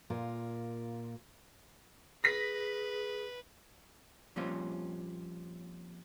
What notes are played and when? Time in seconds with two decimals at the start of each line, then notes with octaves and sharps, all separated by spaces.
0.10 A#2 F4 A#4
2.24 G#4 B4 A#6 B6
4.36 F2 A#2 G3 C4 C#4 F4